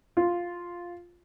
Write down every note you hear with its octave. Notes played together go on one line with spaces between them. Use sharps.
F4